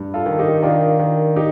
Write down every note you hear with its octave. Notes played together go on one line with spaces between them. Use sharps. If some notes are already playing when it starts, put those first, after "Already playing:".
Already playing: G2
F4 A4
D#3
D#4 G4
D#3 D4 F4
D#3
D#4 G4